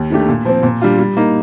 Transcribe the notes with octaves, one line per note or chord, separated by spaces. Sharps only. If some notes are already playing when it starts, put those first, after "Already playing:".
Already playing: D#2
D#3 A3 D4 G4
A#2
F3 C4
A#2
G3 D4 F4
G3
A#3 D#4